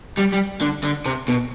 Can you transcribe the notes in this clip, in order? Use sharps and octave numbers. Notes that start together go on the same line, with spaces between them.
G3
G3
D3
D3
C3
B2